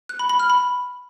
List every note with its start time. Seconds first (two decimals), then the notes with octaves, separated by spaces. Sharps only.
0.09 F#6
0.19 B5
0.29 B5
0.40 F6
0.50 B5